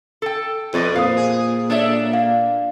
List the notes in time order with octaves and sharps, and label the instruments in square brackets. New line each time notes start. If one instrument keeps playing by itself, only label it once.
[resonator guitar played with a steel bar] A4 G5
[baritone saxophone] F2 [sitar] B2 [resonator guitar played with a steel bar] B4 D5 D#5
[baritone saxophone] A#2 [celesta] C5 D#6 [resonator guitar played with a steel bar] F5
[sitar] G#4
[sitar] D4 [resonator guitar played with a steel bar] A4 C#5 E5
[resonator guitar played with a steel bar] A#3 [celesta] F5